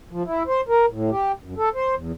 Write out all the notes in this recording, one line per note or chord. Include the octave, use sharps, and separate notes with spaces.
F3
E4
C5
A#4
A2
G4
F#2
A4
C5
E2